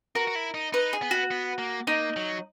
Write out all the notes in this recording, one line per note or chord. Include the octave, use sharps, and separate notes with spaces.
F#4 A#4
F#4
E4
D#4
D#4 B4
G#4
B3
F#4
B3
A#3
A#3 D#4
F#3